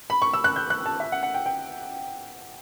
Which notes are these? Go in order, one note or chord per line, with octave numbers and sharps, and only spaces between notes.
B5
C#6
E6
F#6
G6
F#6
A5
E5
F#5
F#5
G5
G5